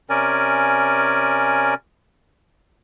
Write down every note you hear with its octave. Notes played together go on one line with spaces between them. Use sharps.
C3 C#4 A#4 D5 G#5